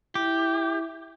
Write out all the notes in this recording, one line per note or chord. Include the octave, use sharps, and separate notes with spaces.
E4 G4